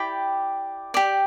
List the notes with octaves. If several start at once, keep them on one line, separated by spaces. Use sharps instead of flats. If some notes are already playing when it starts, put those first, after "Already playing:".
Already playing: E4 G4 D5 G5 B5
G4 D5